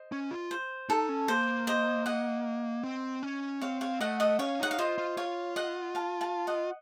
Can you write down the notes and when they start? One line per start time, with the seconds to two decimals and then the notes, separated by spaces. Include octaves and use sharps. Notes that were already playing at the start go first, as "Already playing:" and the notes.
Already playing: C5 D#5
0.12 C#4
0.31 F4
0.51 C5
0.89 D#4 A4
1.09 C#4
1.28 A#3 C5
1.67 C5 D#5
2.06 D#5 F#5
2.83 C4
3.23 C#4
3.61 C4 C#5 F5
3.81 C#5 F5
4.01 A3 D#5 F#5
4.20 D#5 F#5
4.39 C#4 C#5 F5
4.59 D#4 F#5
4.71 F5
4.78 F4 C5 D#5
4.98 F4
5.17 F4 C#5 F5
5.56 D#5 F#5
5.95 F5 A5
6.21 F5 A5
6.47 D#5 F#5